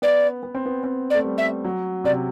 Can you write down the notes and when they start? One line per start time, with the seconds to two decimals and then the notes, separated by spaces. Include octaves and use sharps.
0.02 B3 D5
0.43 B3
0.55 C4
0.66 B3
0.84 C4
1.10 D5
1.14 A3
1.24 G3
1.38 E5
1.64 F#3
2.04 C3 D5